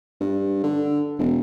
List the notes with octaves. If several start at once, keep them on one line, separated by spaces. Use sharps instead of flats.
G2
D3
E1